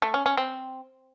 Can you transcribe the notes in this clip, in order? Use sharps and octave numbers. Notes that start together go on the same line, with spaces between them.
A3
C#4
C#4
C4